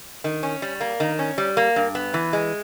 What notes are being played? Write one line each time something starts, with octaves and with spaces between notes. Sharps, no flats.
D#3
C#4
G3
A#3
D#3
C#4
G3
A#3
G2
B3
E3
G#3